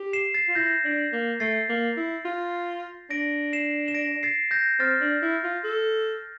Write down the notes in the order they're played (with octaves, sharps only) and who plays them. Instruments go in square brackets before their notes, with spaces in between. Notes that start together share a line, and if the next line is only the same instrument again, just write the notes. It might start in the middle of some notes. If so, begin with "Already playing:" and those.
Already playing: [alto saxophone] G4
[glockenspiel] C7 E7
A6 C7
[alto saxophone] F4
[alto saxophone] E4 [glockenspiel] G6 A#6
[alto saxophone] D4
A#3
[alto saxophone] A3 [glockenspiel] A6 C7
[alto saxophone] A#3
E4
F4
[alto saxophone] D4 [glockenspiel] A#6 D7
[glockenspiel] C7 E7
E7
A#6 D7
A6 C7
G6 A#6
[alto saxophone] C4 [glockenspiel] F6 A6
[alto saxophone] D4
E4
F4
A4